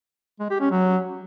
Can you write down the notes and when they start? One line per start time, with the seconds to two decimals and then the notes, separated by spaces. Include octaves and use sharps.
0.40 G#3
0.50 G4
0.61 C#4
0.71 F#3